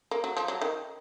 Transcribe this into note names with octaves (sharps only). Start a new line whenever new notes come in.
A#3
F#3
F3
F#3
D#3